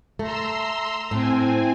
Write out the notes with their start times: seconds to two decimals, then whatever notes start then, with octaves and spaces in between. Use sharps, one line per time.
0.19 A3 A#5 C6 E6
1.11 A2 C4 G#5